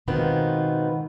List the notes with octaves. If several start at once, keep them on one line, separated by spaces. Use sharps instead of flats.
G#2 B2 D#3 B3 C4 F4